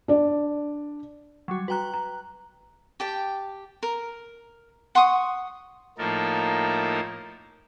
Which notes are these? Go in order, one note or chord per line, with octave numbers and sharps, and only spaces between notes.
D4 D5
F#3 G3 F#4
F#4 B4 G5 A#5 F#6
A#5
G4 G5 A5
A#4
F#5 C6 C#6 D#6
A2 F3 A#3 D#4 A4 A#4